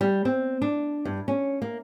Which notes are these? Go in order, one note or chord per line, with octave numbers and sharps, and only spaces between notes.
G3
C4
D4
G2
C#4
A#3